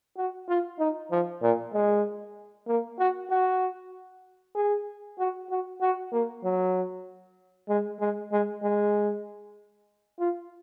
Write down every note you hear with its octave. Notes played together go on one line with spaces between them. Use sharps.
F#4
F4
D#4
F3
A#2
G#3
A#3
F#4
F#4
G#4
F#4
F#4
F#4
A#3
F#3
G#3
G#3
G#3
G#3
F4